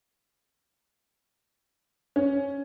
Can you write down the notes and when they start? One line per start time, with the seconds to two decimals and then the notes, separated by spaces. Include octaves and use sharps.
2.16 C#4